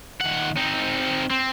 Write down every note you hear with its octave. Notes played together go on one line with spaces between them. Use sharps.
D#2 F#5
C4 D#4
C4